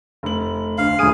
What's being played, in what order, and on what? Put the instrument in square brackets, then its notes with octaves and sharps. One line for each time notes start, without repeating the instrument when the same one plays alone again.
[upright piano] F1 F#7
[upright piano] D2 [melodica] F5
[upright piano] D#1 D2 D#7 [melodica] G#4